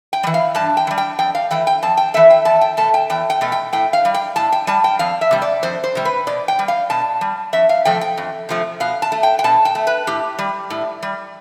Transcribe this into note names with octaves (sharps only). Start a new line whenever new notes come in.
G5
G3
E3
F5
G2 A5
G5
E3
G3
G5
F2 G5
F5
E3 A3 G5
G5
F2 A5
G5
E3 A3 E5
G5
E2 A5
G5
B2 A3 A5
G5
E2 G5
G5
B2 A3
G5
A2 G5
F5
G3
G5
A2 A5
G5
G3 A5
G5
F2 F5
E5
C3 G3
D5
F2 C5
C5
C3 G3
B4
B2 D5
G5
G3
F5
B2 A5
G3
F2 E5
F5
C3 F3 A3 G5
G5
F2
C3 F3 A3
B2 F5
A5
A3
G5
G5
B2 A5
G5
A3
B4
A2 G4
G3
A2
G3